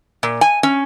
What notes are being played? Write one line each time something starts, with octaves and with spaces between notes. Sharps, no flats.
A#2
G#5
C#4